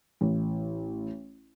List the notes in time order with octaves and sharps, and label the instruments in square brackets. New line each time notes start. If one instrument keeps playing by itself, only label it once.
[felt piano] A1